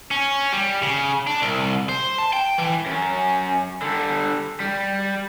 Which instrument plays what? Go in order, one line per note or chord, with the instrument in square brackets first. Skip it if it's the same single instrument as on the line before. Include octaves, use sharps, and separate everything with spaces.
[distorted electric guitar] C#4
G3
C#3
D4
C2
C5
A5
G5
E3
[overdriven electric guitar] F#2 C#4
D3 G3
G3